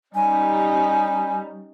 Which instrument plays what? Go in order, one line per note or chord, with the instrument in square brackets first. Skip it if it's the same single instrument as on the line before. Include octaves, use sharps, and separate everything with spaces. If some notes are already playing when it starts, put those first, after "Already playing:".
[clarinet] G3 [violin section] C#4 D#4 G4 [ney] G#5